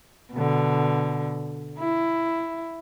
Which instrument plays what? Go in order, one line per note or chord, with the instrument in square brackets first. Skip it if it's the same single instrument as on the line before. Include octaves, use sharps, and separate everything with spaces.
[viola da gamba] B2 D3
E4